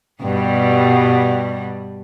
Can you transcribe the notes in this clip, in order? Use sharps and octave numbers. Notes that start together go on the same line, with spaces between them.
G2 B2 G3